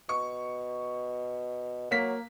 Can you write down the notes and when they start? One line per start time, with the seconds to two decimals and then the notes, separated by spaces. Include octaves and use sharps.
0.09 B2 C#6
1.91 F#3 A#3 B6